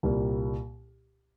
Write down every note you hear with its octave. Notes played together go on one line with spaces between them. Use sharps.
C2 A#2 G3 A#3